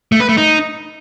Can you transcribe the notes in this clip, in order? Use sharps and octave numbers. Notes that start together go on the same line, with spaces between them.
A3
B4
A3
D#4